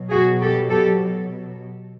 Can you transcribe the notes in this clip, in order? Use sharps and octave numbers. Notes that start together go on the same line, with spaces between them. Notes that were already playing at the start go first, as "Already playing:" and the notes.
Already playing: B2 F#3
F#4 G#4
G4 A4
G4 A4